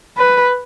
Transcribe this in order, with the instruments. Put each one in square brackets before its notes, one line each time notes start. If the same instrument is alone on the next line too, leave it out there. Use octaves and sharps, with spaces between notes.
[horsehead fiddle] B4